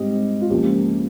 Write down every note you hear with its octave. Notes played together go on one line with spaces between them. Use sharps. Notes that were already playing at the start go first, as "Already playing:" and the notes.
Already playing: G#2 G3 C4 D#5
F4
C#2 C#3 F3 A#3 G4